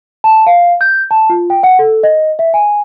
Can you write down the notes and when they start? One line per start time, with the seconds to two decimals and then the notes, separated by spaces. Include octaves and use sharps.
0.24 A5
0.47 F5
0.81 G6
1.11 A5
1.30 F4
1.50 G5
1.63 F#5
1.79 A4
2.03 D#5
2.39 E5
2.54 G#5